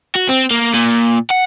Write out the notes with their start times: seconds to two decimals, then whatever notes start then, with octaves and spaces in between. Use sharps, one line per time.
0.15 F#4
0.29 C4
0.51 A#3
0.74 A#2
1.30 F#5